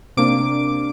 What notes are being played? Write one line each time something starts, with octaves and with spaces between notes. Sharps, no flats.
C3 A#3 D4 D6